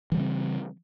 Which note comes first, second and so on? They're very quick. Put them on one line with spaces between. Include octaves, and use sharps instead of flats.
E3 G3 C#3 C4